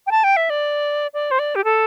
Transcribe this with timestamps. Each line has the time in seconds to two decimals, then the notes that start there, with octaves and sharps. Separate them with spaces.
0.07 G5
0.11 A5
0.24 G5
0.36 E5
0.50 D5
1.14 D5
1.31 C5
1.39 D5
1.55 G4
1.64 A4